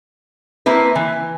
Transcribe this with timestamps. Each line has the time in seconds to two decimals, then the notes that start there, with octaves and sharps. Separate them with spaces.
0.66 A#3 C4 E4 B4
0.95 E3